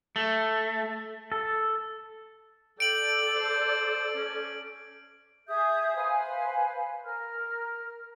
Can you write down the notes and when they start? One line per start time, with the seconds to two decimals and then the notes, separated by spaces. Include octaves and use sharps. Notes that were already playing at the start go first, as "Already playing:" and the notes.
0.16 A3
1.32 A4
2.80 A4 D5 G5 D7 F#7
3.36 C5
4.16 C#4
5.47 G#4 E5 D#6 G6
5.96 B4 C5 F5 G#5
7.04 A#4 F6